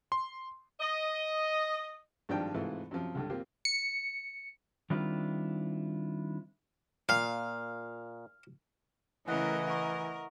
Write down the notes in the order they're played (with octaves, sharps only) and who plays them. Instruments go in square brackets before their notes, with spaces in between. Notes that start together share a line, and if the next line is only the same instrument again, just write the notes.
[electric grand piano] C6
[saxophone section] D#5
[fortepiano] G#1 G2 D#3 F3 D4 G5
G#2 C3 E3 A3 E4 F4
F#2 C3 F3
C#2 G2 D3
A#3 C4 F4 G4
[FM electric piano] C#7
[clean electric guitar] D#3 G3 C4 D4 E4 F4
[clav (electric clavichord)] A#2 [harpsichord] F5
[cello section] C#3 A3 A#4 [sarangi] E3 [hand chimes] E4 F#5 F#6 [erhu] D#5
[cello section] A#4 [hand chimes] F#5 C#6